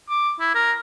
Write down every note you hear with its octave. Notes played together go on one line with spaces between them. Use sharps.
D6
E4
A#4